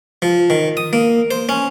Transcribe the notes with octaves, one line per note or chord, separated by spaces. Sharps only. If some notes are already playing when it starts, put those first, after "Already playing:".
F3
D#3
D#6
A#3
C5
C#4